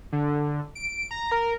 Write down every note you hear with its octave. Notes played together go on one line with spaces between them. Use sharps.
D3
D7
A#5
A#4